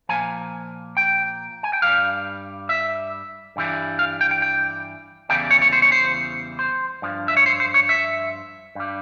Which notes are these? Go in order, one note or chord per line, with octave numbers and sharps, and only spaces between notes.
A#2 F3 G#5
G5
G#5
G5
G2 E3 G3 F5
E5
G2 E3 G3
F5
G5
G5
G5
E2 C#3 E3 G3 G5
C#5
C#5
C5
C#5
C5
C5
G2 F3
E5
C#5
C5
C5
C#5
E5
G2 G3